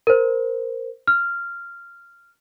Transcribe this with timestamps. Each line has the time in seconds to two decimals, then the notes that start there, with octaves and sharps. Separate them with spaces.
0.07 A#4 C5
1.07 F6